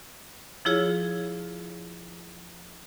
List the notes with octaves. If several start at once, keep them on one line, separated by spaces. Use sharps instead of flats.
F3 E4 F4 G#4 C#5